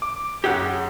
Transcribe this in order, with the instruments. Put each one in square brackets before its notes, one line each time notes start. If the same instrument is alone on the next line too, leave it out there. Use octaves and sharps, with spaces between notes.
[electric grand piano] D6
[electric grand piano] F#2 G#4 [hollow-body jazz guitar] G4 C#5 F#5